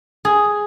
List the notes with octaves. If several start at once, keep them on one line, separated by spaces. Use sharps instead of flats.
G#4